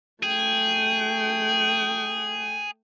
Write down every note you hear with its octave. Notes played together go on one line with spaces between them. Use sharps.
A3 G#4 G5